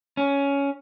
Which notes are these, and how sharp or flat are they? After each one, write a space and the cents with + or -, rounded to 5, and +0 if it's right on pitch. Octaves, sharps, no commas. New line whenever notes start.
C#4 +10